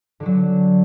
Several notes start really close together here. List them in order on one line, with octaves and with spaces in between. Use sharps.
D3 F#4 F#3